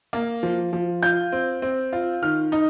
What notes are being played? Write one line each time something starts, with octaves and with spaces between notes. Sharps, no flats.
A#3
F3
F3
F4 G6
C4
C4
F4
D#3 F6
D#4